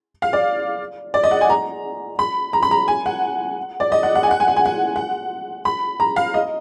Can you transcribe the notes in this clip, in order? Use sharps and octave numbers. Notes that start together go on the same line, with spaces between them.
F5
D5
D5
D#5
F#5
G#5
A#5
B5
A#5
B5
A#5
G#5
F#5
D5
D#5
F#5
F#5
G#5
F#5
G#5
F#5
G#5
F#5
F#5
B5
A#5
F5
D#5